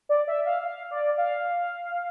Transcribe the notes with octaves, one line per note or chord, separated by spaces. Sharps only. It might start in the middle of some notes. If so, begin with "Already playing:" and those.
D5
E5
F5
F5
D5
F5